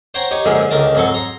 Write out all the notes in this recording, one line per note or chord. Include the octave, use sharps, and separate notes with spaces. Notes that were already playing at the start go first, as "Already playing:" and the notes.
C5 C#5 F#5 G5 A#5
D#4 G4 C#5
F#2 A#2 D3 F3 G#3
C#2 D3 D#3 A#4 A5
F2 G#2 F#3 A4 C#6
A#5 C6